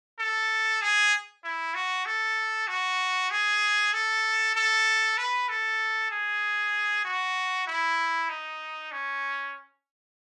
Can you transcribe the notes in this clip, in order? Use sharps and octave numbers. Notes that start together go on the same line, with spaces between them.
A4
G#4
E4
F#4
A4
F#4
G#4
A4
A4
B4
A4
G#4
F#4
E4
D#4
C#4